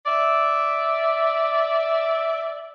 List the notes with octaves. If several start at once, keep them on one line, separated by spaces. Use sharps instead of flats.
D5 E5